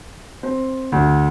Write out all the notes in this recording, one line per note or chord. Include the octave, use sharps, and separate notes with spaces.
C4
D2